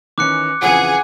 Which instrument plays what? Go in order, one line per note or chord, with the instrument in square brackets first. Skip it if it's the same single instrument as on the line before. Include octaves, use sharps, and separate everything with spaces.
[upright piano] D#3 E3 C#4 [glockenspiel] D6 F#6 C#7
[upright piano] F2 C#3 E3 [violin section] G#4 [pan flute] F#5